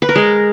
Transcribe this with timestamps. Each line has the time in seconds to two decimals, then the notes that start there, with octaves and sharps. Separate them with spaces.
0.02 B4
0.09 A#4
0.16 G#3